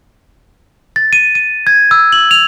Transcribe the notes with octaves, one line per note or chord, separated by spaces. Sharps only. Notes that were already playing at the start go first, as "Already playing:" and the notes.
A6
D#7
D#7
G#6
E6
F#7
F7